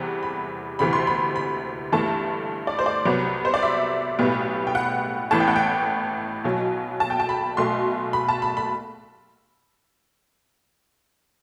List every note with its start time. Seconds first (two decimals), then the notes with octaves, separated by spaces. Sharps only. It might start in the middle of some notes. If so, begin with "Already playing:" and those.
Already playing: E2 C3 E3 G3 F#5
0.23 B5
0.79 D2 C3 E3 B5
0.93 C6
1.07 B5
1.36 B5
1.92 G1 G2 E3 A3 A5
2.67 D5
2.79 C5
2.86 D5
3.05 C2 C3 F#3 B3
3.45 C5
3.54 D5
3.63 E5
4.19 B1 A2 G3 B3
4.67 G5
4.75 F#5
5.31 A1 A2 E3 B3 A5
5.40 G5
5.48 F#5
5.56 G5
6.44 B1 B2 F#3
7.00 A5
7.10 G5
7.20 A5
7.29 B5
7.57 B1 B2 A3 C6
8.13 B5
8.29 A5
8.42 B5
8.57 B5